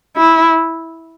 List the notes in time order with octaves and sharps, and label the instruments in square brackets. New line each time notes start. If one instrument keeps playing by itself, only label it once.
[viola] E4